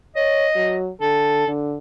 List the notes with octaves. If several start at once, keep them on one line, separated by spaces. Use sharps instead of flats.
C#5 D#5
F#3
D3 A4
D3